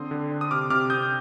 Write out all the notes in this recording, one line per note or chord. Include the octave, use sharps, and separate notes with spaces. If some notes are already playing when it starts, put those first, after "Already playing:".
Already playing: D3 C4 C6 D#6
D3
D4
D#6
C3 D6 F6
C3 D6 F6
C4 D#6 G6